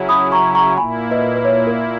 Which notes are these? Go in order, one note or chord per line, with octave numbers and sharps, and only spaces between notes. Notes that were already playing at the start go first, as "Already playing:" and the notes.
Already playing: C#3 F#3 C#4 E4
B5 D#6
A#5 C#6
A#5 C#6
A#2 A#3 E4 G#5 B5
B4 D#5
B4
C#5
A#4